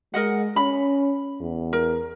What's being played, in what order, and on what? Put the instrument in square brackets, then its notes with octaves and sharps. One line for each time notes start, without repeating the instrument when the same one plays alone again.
[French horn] G#3 [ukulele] A#4 D#5 F#5
[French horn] C#4 [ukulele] B5
[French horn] E2
[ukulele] A#4